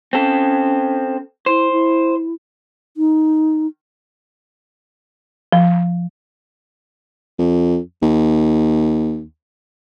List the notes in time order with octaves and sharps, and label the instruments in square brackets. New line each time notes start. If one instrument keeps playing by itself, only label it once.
[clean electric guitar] C4 A4 [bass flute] C#4
[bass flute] E4 [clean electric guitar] C5
[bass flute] E4
D#4
[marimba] F3
[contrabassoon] F2
D#2